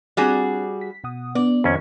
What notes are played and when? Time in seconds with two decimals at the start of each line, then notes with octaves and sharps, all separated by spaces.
0.17 G3 C4 D4 F#4 G#4 D5
0.81 B6
1.04 B2 F#5 D#6
1.35 B3 D4 D5
1.64 F2 D#3 F3 C#4 G#6